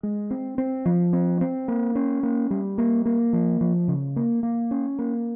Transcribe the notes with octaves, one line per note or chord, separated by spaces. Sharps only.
G#3
C4
C4
F3
C4
C4
A#3
C#4
A#3
G3
A#3
A#3
F3
F3
C#3
A#3
A#3
C#4
A#3